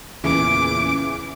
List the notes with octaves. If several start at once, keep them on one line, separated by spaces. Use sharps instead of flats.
E2 A#2 C#3 E3 D6